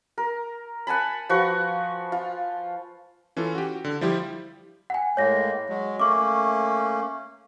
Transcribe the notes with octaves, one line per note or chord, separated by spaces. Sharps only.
A#4
F#5 G#5 A5 B5
F3 F#4 B4 C#6
F4
E3 C#4 F4 A4
F#4 G4
D3
F3 G3 E4 F4 G4
F#5 G#5
A2 G#3 A#3 C#5 A#6
F#3 G#3
A3 A#3 C#4 C#6 D6